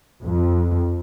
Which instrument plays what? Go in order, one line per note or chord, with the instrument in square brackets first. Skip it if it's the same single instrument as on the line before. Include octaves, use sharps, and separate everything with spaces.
[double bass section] F2